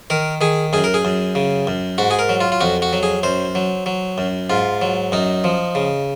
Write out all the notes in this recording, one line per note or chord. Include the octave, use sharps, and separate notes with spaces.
D#3 A#4
D#3 G#4
F#2 G#4
A#4
G#4
F#2
C#3
F#2
G#2 F#4
G#4
A#4
F#3
F4
F4
F2 F#4
F#4
F#3
G#4
F#2 C5
F#3
F#3
F#2
G#2 F4
F#3
F#2 D#4
F3
C#3